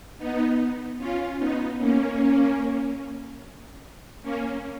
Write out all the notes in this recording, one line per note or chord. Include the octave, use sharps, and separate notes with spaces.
B3 D#4
C#4 F4
B3 D#4
A#3 C#4
A#3 C#4